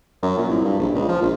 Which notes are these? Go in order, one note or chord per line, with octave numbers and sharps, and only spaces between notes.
F#2
A#2
C2
G2
A#1
C#2
F3
A#1